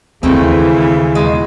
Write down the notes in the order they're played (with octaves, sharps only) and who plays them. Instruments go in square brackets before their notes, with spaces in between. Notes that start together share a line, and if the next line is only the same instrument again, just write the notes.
[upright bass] D#2 [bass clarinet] C#3 [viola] E3 [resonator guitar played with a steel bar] G#3 A3 C4
[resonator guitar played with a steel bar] B2 F3 G#3